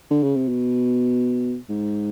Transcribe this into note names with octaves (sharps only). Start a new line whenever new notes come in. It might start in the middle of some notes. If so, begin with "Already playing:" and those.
D3
C#3
C3
B2
G#2